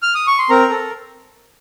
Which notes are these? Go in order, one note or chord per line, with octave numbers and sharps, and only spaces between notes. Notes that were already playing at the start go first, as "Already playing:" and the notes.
F6
D#6
C#6
C6
C4 A#4 A#5
A4